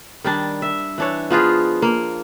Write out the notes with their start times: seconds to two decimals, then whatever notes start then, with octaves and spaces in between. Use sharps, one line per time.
0.24 D#3 G3 D4
0.62 E5
0.98 E3 D4 C#5
1.30 F3 B3 F4 G#4
1.82 A#3